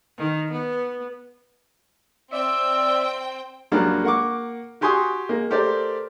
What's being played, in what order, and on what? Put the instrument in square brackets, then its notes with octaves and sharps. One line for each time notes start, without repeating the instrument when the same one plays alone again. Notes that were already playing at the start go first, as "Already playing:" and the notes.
[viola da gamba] D#3
B3
[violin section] C4 G5 [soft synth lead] D5 [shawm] E5
[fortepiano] C#2 F#3 G3 A#3 D4 F6
A#3 F#5 C#6 D6
F#4 G4 G#5 C6 C#6 D#6
G#3 A#3
A3 G4 A#4 C5 D5